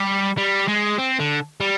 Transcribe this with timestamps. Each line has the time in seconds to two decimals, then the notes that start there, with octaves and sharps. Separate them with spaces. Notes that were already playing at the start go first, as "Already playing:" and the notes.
Already playing: G3
0.38 G3
0.68 G#3
0.99 C4
1.20 D3
1.61 G3